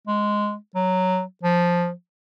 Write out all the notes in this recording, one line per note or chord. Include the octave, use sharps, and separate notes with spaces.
G#3
F#3
F3